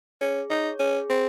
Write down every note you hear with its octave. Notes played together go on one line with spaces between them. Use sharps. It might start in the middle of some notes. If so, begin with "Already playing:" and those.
C#4 G#4
D#4 C#5
C#4 G#4
C4 G#4